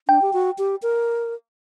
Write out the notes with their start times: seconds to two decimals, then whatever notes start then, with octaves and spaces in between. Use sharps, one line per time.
0.08 D4 G5
0.22 G4
0.33 F#4
0.58 G4
0.82 A#4